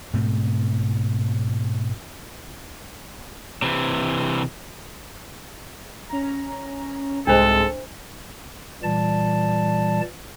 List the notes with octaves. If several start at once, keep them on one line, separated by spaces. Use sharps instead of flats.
G#2 B2 A3 C4
C3 E3
C#4 A#5
C2 G#2 C3 G#3 D4 A4 C5
A#2 E3 G3 D5 A5